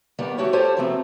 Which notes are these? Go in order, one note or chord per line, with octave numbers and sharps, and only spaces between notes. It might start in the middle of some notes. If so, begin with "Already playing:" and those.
D2 D#3 G3 A#3 B3 F#5
A3 F#4 G4 C#5
F4 G4 A4 C5 C#5
C3 F3 F#3 A3 B3 C4